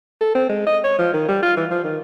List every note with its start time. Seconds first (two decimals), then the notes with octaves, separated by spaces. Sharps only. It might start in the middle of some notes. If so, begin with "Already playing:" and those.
0.21 A4
0.35 C4
0.49 G#3
0.67 D#5
0.84 C#5
0.99 F3
1.14 D#3
1.28 G3
1.43 F4
1.57 E3
1.71 F3
1.84 D#3